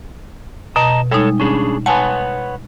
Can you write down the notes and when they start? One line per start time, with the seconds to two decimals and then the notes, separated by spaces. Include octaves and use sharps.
0.76 B2 D#5 A5 A#5
1.11 G3 G#3 D#4 A4 C#5
1.40 C#4 D4 G#4
1.86 B4 C#5 F#5 G#5 A5